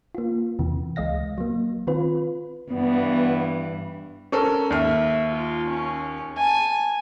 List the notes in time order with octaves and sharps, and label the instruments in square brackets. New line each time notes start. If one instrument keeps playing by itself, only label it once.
[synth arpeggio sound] A#3 F4
E2 C3 E3
C#2 G#3 D#5 F5 A#6
F#3 A#3
D#3 C4 F4 B4
[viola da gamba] G2 E3 [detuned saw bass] B3
[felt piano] C#4 A4 A#4
[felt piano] D#2 F6 [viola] E5
[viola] F4
C#4
G#5 A5